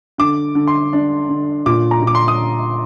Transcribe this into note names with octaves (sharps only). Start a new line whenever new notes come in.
D3 D6
D3
C6
D4
D3
A#2 D6
A#5
A#2
D6
C6
D#6